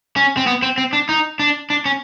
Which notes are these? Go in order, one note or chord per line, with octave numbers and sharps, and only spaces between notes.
C#4
C4
B3
C4
C4
D4
D#4
D4
D4
C#4